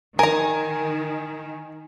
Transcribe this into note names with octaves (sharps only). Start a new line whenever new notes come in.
D#3 A#4 G#5 A#5